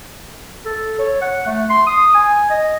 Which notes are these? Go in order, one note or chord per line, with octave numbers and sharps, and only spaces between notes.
A4
C#5
F#5
A3
C6
D#6
G#5
D#5